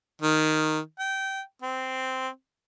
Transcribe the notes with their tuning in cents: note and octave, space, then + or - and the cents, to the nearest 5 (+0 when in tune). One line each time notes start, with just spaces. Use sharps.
D#3 -5
G5 -20
C4 -10